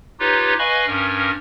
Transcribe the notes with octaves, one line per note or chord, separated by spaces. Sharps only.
D#4 F4 G4 B4 C#5
B4 D#5 F5 G#5 B5 C#6
G2 C#4 A#4